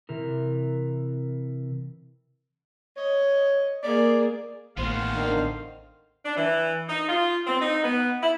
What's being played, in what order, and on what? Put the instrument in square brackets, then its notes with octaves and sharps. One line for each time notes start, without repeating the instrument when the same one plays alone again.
[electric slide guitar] C3 E3 A#4
[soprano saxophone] C#5 [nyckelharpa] D#5
[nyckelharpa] A#3 G#4 [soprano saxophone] D5
[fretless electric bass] A1 [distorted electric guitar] D#2 B3 [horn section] C5 F5
[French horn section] D3 D#3
[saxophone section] D4
E3
D#4
F4
C4
D#4
B3
E4